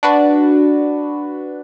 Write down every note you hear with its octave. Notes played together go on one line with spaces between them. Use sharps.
D4 F#4 B4